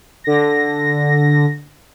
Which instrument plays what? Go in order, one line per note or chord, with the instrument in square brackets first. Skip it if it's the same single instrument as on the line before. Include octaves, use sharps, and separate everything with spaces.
[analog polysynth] D3 A#6